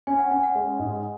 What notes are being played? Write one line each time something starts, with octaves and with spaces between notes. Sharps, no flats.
C#4 G#5
F#5
C#4 G#5
F#5
G#3
G#2